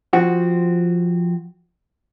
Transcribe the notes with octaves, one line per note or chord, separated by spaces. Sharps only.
F3 C4 F#4